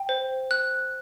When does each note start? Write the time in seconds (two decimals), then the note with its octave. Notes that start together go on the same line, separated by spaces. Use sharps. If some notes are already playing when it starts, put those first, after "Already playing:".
Already playing: G5
0.09 C5
0.51 F#6